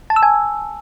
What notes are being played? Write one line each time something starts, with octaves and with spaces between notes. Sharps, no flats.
A5
E6
G#5